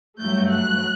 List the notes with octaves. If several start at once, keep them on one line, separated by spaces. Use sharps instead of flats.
G2 F#3 A3 G6
F#6